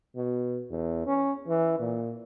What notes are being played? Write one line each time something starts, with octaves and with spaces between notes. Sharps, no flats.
B2
E2
C#4
E3
A#2